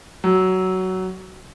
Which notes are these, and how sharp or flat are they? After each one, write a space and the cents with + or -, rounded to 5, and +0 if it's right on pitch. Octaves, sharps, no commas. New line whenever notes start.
F#3 +15